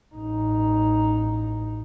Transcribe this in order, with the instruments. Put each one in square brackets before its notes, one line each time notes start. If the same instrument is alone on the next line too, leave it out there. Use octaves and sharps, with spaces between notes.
[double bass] A1 D#4